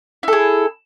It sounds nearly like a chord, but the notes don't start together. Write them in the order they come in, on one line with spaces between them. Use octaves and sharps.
E4 A4 G#4